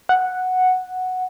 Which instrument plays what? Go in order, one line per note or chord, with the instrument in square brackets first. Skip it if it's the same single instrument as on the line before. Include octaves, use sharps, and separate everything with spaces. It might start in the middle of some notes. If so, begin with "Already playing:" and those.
[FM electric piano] F#5